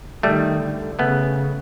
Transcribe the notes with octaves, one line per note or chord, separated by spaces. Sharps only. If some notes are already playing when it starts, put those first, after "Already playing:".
D#3 G3 A3
D3
C#3 A3 B3